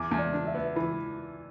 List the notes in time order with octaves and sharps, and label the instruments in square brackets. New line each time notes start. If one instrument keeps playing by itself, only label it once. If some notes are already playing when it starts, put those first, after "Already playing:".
Already playing: [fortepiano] E2 [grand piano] D6
[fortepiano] E2
[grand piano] D5
[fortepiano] D4
[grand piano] E5
[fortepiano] B3
[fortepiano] E3 [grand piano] B5